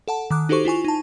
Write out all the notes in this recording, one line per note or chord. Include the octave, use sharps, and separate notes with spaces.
A4 F#5 A5
D#3 D6 F#6
D#4 F#4 G4 A4 C5 C#6
E4 F4 G#5 C#6
D#4 A5